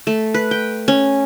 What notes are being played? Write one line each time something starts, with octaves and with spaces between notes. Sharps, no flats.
A3
B4
G5
C#4